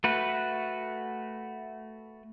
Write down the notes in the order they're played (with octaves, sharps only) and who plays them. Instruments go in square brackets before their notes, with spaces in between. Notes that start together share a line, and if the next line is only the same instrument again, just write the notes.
[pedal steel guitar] A3 F#4 B4